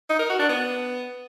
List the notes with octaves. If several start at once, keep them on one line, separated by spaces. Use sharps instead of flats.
D#4
A#4
F#4
D4
B3